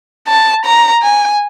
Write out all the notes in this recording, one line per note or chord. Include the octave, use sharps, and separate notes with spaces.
A5
A#5
G#5